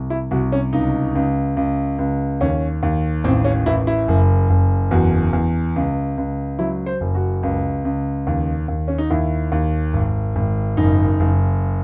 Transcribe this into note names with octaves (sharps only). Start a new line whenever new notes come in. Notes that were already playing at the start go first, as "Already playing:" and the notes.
Already playing: C2
E4
C2 F#4
C#4
C#2 D#4
C#2
C#2
C#2
D#2 C#4
D#2
A1 C4
C#4
A1 E4
E4
F#1
F#1
E2 F#4
E2
C#2
C#2
F#3 E4
C5
F#1
F#4
C#2
C#2
D#2
D#2
C#4
D#4
D#2 E4
D#2
G#1
G#1
F#1 D#4
F#1